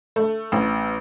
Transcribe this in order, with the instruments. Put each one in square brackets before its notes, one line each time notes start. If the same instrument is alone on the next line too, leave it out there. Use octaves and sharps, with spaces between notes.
[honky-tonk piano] A3
A1